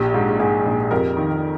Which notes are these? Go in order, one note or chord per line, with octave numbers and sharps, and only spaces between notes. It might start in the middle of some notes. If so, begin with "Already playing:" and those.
Already playing: A#1 G4
G#2
G#2 G#4
A#1
F2 G4 A#4
D#3